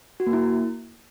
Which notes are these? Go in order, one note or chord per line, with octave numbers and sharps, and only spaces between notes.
F#4
A#3
E4